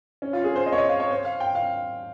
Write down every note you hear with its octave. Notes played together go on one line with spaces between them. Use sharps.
C#4
F4
G#4
C5
D#5
C#5
D#5
F5
C#5
C5
F5
G5
F5